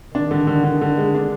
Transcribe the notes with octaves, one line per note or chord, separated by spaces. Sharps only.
D#3 D4
D3
D3
D3
D3
G#3
D4